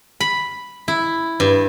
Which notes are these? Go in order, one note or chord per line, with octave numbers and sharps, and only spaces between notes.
B5
E4
G2